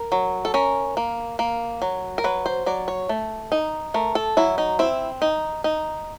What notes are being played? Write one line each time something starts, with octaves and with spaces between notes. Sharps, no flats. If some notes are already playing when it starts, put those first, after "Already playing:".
Already playing: A#4
F#3
A4
C#4 A#4
A#3
A#3
F#3
A#4
F#3 B4
C5
F#3 D5
C#5
A3
D#4
A3 A#4
A4
F#3 E4
D#4
C4 E4
D#4
D#4